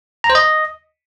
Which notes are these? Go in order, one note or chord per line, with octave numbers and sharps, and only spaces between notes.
A#5
C5
D#5